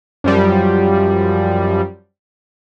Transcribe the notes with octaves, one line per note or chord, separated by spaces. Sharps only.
F#2 F3 G3